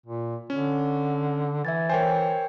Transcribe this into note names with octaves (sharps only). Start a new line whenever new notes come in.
A#2
D3 C#4
E3 E5 G#6 A6
A#4 C5 C#5 G5 G#5